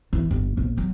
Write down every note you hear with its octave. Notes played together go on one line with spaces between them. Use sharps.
E3
G1
A#1
F#3